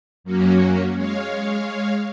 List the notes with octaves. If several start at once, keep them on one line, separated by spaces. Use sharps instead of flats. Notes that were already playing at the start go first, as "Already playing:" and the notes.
F#2 F#3 A#3 C#4 F#4
G#3 C#5 F5